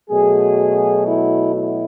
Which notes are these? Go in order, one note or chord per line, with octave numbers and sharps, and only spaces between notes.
B2 F#3 A3 G#4
E4
E4